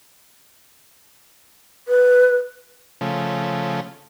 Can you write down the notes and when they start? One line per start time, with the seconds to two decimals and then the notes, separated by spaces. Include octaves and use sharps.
1.88 B4
3.01 C#3 F3 A3